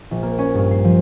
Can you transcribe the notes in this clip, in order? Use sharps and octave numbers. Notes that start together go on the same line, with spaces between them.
A#1
A#3
C#4
G2
C7
F3